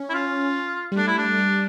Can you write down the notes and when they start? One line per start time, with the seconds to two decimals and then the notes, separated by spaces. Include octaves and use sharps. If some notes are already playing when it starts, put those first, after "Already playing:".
Already playing: C#4
0.10 E4
0.14 F4
0.92 G3
0.97 A3 D4
1.07 E4
1.18 D4
1.38 G3